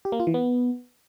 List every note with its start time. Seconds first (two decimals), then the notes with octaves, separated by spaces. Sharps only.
0.05 G4
0.12 A#3
0.20 F4
0.27 E3
0.34 B3